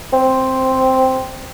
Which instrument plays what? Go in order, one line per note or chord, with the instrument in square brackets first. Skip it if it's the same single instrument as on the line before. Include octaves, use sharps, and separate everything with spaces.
[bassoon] C4